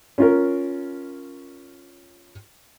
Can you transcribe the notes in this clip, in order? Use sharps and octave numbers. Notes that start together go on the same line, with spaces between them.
C#4 F4 A#4